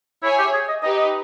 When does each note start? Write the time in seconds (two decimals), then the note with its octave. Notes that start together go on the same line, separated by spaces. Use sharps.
0.23 E4 G#4 C#5 E5 G#5
0.39 G4
0.54 G#4
0.69 D#5
0.83 D#4 G4 B4 D#5
0.98 D#5